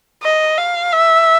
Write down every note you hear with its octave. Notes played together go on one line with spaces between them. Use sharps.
D#5
F5
E5